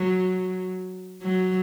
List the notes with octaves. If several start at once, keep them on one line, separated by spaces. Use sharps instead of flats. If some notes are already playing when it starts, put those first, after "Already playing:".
Already playing: F#3
F#3